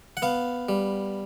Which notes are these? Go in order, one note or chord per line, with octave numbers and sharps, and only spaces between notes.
F#5
B3 F5
G3